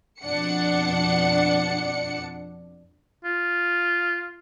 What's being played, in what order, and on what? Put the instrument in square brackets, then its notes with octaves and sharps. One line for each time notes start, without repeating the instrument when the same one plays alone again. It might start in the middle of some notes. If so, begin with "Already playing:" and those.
[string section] F2 B2 D4 F#5 C#7
[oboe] F4